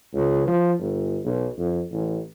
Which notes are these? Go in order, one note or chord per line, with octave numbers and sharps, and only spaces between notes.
C#2
F3
G1
B1
F2
A1